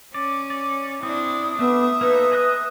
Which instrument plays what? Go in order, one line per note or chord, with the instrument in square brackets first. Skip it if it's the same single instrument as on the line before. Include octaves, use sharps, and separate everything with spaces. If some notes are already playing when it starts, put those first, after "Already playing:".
[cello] C#4 [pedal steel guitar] D5
[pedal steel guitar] D5
[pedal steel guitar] C4 [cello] D4 E4 [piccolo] D#6
[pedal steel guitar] A3 D4 [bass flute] B3 [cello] E5
[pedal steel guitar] A#3 D#4 A4 [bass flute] B4
[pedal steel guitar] G#4 D#5 F#6